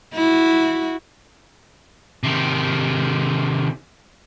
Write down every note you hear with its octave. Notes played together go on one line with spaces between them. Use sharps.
E4 F#4
C3 D#3